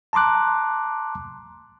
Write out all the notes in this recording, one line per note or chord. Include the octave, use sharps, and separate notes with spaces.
A5 A#5 C6 D6 F#6